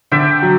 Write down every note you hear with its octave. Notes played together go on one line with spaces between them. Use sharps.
D3 E5 G5
F#3